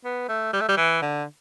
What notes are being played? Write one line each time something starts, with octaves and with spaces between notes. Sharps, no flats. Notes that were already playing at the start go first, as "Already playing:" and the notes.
B3
A3
G3
A3
G3
E3
D3